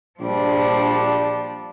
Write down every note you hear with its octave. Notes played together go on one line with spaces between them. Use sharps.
A#1 F3 G3 D4